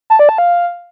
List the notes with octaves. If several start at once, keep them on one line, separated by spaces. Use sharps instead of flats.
A5
D5
A5
F5